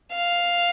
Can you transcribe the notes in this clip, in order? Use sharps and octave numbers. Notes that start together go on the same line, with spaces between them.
F5